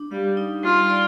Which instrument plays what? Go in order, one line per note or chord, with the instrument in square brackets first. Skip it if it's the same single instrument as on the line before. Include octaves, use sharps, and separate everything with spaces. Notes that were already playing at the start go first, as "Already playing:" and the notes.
Already playing: [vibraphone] D4
[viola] G3 [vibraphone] F5
[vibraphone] D#4
[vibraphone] G3 [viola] F4
[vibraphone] D5